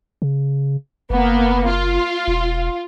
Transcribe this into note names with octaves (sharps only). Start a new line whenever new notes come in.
C#3
F#1 A#3 B3
F4
E1